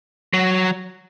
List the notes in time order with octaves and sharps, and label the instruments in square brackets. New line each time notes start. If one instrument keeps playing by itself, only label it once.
[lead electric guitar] F#3